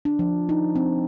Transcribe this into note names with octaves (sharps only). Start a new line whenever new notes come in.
D4
F3
D#4
C4